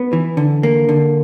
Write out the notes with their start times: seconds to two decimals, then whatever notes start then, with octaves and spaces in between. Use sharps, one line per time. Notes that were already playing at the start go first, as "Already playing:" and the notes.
Already playing: B3
0.13 E3
0.37 D3
0.63 A#3
0.89 D3